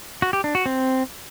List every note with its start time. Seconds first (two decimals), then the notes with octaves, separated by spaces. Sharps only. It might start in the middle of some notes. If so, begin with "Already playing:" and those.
0.22 F#4
0.33 G4
0.44 D4
0.55 F#4
0.66 C4